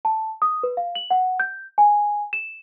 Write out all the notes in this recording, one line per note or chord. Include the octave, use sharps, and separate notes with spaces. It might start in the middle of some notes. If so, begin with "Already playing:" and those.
A5
D#6
B4
F5
F#7
F#5
G6
G#5
E7